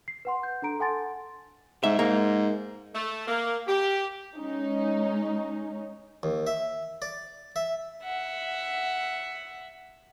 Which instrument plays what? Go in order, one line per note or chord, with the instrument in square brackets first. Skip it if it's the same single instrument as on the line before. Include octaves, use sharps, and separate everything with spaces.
[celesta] C7
B4 F#5 C6
G6
D4 A4 A#5 D7
A4 F#5 G#5 A5 C6 A6
[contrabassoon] G#2 [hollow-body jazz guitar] E5
[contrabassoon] G#2 [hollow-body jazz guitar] A#3
[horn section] A3
A#3
G4
[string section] G#3 C#4 D#4
[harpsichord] D#2
E5
D5
E5
[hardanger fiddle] E5 F#5